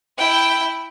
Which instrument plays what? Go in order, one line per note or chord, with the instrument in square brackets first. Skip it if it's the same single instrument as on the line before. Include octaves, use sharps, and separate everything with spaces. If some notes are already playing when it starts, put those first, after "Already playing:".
[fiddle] E4 G5